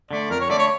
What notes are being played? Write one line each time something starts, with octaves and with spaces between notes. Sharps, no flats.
D3 A3 D5
F2 A#4
C#5
D3 A3 D5
C#5